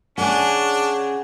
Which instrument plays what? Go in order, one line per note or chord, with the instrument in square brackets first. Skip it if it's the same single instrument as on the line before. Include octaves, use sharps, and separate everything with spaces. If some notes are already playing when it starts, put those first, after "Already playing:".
[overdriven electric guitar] C#3 C#4 [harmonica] D4 [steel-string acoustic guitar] F#5 G#5